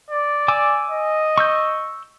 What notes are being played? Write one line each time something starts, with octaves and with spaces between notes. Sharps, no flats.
D5
G#5 D6 E6
D#5
C#6 E6 G6